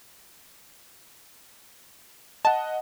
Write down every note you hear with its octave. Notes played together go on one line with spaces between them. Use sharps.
D#5 F#5 A5